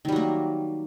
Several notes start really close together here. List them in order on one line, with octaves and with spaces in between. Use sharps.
D#3 G3 F#3 A#3